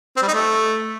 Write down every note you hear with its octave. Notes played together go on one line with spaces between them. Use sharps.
C4
G3
D#4
A3